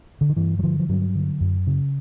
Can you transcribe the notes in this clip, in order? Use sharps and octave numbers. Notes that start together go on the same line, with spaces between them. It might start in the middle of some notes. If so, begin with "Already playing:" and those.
D3
D#3
G2 E3
F#3
D3 F3
F3
G2 F#3
D3
F#2
C#3